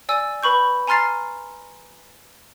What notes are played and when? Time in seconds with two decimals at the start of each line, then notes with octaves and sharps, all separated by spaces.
0.09 D5 G#5 E6
0.43 B4 B5 C#6 G6
0.87 G#5 A#5 C6 F6 A6 C7